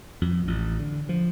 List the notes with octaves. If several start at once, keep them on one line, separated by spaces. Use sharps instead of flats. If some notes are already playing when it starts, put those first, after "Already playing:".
F2
A1
D3
F3